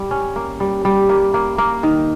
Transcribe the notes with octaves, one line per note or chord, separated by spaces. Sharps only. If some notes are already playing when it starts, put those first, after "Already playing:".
Already playing: G3
C#4
A#3
G3
G3
A#3
A#3
A#3
D#3